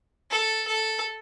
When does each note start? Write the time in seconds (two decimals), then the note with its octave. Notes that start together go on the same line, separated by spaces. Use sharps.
0.30 A4
0.67 A4